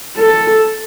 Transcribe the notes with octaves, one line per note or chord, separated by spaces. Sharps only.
A4